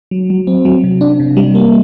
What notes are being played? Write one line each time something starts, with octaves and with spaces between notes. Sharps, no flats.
F#3
F#3
C4
F#3
C3
D4
C3
G3
A#3